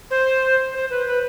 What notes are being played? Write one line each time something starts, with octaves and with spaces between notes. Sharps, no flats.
C5
C5
B4
B4